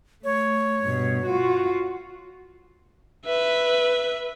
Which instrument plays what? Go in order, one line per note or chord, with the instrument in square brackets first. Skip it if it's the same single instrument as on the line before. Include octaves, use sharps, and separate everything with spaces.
[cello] A3 [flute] C#5
[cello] G2 B2
F4 F#4
[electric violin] B4 E5